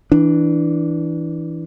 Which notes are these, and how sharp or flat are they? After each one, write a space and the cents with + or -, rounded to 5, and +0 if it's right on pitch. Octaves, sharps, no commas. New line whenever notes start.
E3 -10 D4 +0